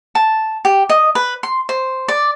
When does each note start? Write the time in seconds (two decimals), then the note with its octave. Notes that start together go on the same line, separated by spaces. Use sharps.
0.15 A5
0.65 G4
0.90 D#5
1.15 B4
1.43 C6
1.69 C5
2.08 D5